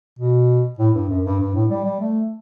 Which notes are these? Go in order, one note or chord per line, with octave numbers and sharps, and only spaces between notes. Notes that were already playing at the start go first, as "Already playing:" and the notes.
B2
A2
G2
F#2
G2
G2
A2
G3
G3
A3